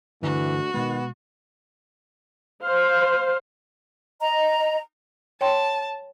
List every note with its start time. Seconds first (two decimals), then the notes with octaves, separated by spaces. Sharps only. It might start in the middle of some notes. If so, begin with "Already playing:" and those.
0.23 D2 G2 D3 E3 F#4
0.74 B2 D#3 G#3 B3
2.61 C5 F5
4.20 D#5 A#5
5.41 C#5 G5 A5 C6